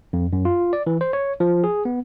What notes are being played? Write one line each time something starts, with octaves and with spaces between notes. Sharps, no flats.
F2
F#2
F4
D5
E3
C5
C#5
F3
G#4
B3